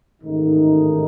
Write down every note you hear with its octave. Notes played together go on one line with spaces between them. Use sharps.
A1 G#2 D#3 A3 D#4